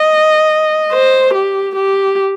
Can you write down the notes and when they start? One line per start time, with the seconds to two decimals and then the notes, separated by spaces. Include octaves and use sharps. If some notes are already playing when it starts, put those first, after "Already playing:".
Already playing: D#5
0.92 C5
1.34 G4
1.76 G4